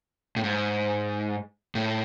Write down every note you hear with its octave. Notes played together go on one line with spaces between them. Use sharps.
A2
G#2
A2